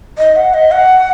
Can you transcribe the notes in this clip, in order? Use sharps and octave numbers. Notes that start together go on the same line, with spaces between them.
D#5
F#5
D#5
F#5